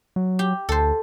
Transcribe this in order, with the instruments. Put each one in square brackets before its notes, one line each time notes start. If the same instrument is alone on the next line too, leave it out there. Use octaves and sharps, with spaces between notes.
[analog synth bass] F#3
[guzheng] G4
[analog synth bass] D2 [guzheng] A4 C5